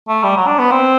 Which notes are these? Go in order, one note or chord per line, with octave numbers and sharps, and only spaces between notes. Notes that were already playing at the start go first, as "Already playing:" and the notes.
A3
G3
F#3
D4
B3
C4